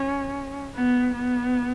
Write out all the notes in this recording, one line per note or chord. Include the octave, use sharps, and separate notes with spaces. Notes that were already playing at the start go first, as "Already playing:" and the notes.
Already playing: C#4
B3
B3